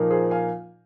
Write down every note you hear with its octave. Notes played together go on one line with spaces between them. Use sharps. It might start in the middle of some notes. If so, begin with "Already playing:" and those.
Already playing: A#2 F3 A#3 D#4
G#4 C5
F5 G#5